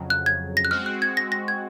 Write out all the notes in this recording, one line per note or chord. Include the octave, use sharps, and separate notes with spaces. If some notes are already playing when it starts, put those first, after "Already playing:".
Already playing: F2 C#3 F#3
F#6
G#6
A#6
F#6
G#3 C4 F#4 F6
F#6
G#6
A#6
A#6
G#6